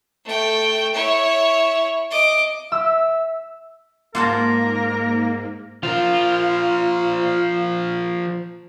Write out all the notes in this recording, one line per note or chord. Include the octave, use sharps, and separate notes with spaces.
A3 G5
E4 C#5
D#5 D6
E5 E6
G#2 A#3 F4 A#4 F#5 A5
F3 F4 A#4